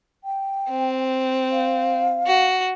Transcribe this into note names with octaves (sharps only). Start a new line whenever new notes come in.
G5
C4
F5
F#4